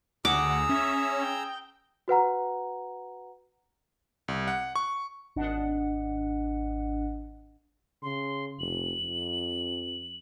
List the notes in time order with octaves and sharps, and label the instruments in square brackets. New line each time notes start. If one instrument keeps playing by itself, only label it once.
[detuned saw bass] D2 [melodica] G#4 A#5 E6 [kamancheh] F#5 [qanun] D6
[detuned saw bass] C#4 [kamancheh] E5
[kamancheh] G5
[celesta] F#4 B4 F#5 A#5
[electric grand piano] C2
F#5
C#6
[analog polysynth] G#1 D4 D#5 F#5
[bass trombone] C#3 [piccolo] C6
[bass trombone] F1 [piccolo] F#7
[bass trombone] F2